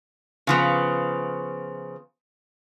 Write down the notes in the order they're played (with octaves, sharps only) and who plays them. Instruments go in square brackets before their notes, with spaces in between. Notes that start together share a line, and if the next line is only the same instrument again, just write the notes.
[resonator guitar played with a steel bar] C#3 F3 B3